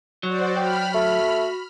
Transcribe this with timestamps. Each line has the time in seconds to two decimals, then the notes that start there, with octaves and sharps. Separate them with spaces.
0.23 F#3 F#4 C5 D5
0.56 G5 B5 F6
0.94 A3 F#4